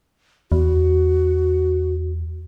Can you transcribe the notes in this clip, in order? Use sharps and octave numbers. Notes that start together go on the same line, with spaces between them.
E2 F#4